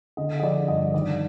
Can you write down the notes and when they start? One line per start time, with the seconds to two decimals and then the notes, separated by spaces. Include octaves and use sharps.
0.17 D3 D#5
0.39 D#5
0.42 F3 D5
0.68 G2 D#5
0.94 D#3 D5